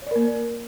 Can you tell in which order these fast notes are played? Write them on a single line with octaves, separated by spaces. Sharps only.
C#5 D5 A#4 A#3